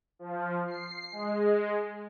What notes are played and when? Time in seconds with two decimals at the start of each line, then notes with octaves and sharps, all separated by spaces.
0.19 F3
0.67 C7
1.12 G#3